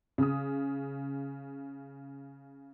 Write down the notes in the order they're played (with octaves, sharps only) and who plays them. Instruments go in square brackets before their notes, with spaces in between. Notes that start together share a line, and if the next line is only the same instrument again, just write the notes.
[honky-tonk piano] C#3 D#6